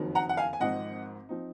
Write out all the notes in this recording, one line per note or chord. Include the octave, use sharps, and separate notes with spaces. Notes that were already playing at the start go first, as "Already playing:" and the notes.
Already playing: F#1 F2 D#3 F#3
F#5 A#5
F#5
F5 G#5
G#5
G#1 G#2 F3 C4 D#5 F#5
F3 C4 D#4